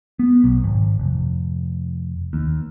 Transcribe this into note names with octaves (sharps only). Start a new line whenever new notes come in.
B3
B1
G#1
F1
D#2